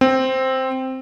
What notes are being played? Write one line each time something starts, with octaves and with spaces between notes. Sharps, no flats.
C4